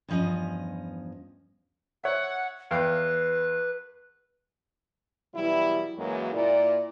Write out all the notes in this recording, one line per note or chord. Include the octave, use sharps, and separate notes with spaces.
E2 G2 F3 C#4 D#5
C#5 E5 F#5
E2 B4 F5 G5
B2 E3 F#3 G3 E4
F#2 E3 F#3 G#3 A#3
A#2 E4 D5